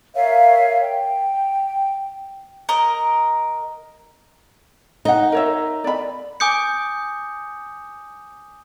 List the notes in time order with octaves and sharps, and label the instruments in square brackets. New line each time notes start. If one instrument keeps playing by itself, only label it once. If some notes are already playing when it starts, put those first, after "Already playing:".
[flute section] A#4 C#5 E5 F5
G5
[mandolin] A#4 D#5
[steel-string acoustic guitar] D#4 [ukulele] D#5 F#5
[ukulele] A#4 C#5 E5
D5 B5
[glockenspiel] G#5 D6 D#6 G6 C#7